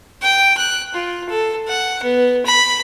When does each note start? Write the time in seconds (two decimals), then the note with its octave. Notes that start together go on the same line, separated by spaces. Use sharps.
0.22 G5
0.58 F#6
0.94 F4
1.29 A4
1.68 F#5
2.02 B3
2.46 B5